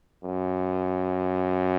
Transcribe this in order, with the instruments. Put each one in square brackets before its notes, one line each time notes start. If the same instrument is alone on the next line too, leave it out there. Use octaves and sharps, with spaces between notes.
[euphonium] F#2